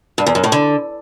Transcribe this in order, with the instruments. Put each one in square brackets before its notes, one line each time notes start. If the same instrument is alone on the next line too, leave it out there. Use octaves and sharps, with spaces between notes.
[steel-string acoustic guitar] G2
E2
F#2
A2
D3